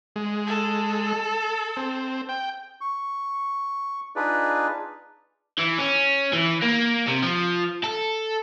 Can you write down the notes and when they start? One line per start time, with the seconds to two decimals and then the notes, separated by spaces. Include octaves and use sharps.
0.16 G#3
0.47 A4
1.77 C4
2.29 G5
2.81 C#6
4.16 D4 D#4 F4 G#4 B4 D5
5.58 E3
5.78 C#4
6.33 E3
6.62 A#3
7.08 C3
7.23 F3
7.84 A4